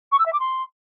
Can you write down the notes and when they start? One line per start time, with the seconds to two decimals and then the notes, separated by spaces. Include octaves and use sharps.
0.11 C#6
0.18 E6
0.25 E5
0.32 D6
0.39 C6